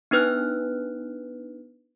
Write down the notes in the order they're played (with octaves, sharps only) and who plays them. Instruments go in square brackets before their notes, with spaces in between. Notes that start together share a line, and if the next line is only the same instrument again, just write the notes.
[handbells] B3 D4 D#4 B4 F6 F#6